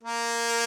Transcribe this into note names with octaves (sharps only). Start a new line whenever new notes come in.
A#3 A#4